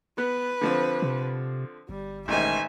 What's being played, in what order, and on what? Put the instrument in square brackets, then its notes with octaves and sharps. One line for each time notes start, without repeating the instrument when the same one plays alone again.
[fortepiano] B3 [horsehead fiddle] B4
[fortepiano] D3 F3 C4
[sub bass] C3
[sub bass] G1 [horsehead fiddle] G3
[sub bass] E1 [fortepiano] A1 G#2 D#3 [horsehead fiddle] E5 G#5